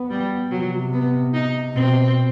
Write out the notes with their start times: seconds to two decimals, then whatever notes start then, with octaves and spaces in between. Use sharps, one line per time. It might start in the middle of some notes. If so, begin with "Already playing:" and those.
Already playing: B3
0.11 G3
0.51 C3 F#3
0.93 B3
1.33 D#4
1.74 B2 C4